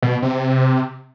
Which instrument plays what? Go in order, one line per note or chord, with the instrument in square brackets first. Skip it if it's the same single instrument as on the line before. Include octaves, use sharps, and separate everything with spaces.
[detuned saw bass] B2
C3